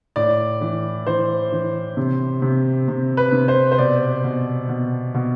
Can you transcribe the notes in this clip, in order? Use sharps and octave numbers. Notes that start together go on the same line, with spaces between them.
A2 D5
E3
E3 C5
E3
C3
C3
C3
B4
C3
C5
C5
B2 D5
B2
B2
B2